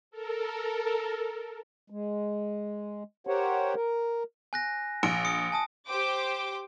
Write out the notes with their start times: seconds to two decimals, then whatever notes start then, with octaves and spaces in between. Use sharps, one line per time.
0.11 A4 A#4
1.90 G#3
3.27 G4 A#4 C5 C#5 F#5
3.75 A#4
4.53 G#5 F#6 A#6
5.03 A#1 D7
5.25 D#6 C#7
5.52 G#5 A5 D#6
5.87 G4 C5 G5 D6